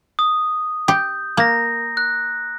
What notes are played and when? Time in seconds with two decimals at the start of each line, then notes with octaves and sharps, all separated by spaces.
0.19 D#6
0.88 G4 G6
1.37 A#3 A#5 A#6
1.97 F#6